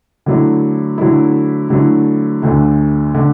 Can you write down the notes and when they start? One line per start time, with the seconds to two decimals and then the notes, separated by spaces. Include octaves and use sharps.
0.26 D3 F#3 A3 E4
0.98 D3 F#3 A3 E4
1.70 D3 F#3 A3 E4
2.42 D2 D3 A3
3.14 D3 A3